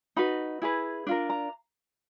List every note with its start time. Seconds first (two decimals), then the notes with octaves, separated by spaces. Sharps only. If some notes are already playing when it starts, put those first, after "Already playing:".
0.16 D#4 F#4 B4 B5
0.62 E4 G#4 B4
1.07 D4 F4 A#4
1.30 A#5